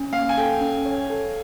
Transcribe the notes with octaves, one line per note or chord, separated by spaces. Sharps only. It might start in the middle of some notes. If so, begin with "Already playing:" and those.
Already playing: C#4
A#3 F5
G#5
A4 G5
C#4
C#5
A4